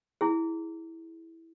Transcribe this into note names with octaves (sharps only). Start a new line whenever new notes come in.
E4 G#4